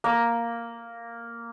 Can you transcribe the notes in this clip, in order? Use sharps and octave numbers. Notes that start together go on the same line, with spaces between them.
A#3